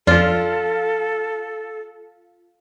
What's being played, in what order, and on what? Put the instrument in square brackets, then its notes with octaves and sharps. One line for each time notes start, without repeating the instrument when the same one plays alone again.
[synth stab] F2 [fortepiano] F3 D4 [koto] F4 [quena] A4